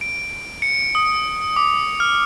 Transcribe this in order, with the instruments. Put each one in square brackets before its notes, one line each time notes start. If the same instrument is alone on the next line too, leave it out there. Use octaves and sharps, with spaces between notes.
[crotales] D7
C#7
D#6
D6
F6